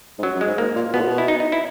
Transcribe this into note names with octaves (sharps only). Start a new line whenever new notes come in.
G#2
F#2 F#3
F#2
G#3
G#2
G#2 A#3
A#2
B2 B3
A#2
B2
E4
D#4
D#4
E4